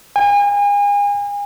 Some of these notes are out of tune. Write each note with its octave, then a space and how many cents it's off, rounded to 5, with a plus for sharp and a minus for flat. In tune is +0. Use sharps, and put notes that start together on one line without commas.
G#5 -35